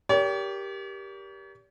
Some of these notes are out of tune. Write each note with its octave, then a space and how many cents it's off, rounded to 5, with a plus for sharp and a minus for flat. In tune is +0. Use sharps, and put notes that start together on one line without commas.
G4 +0 A#4 +15 C#5 +45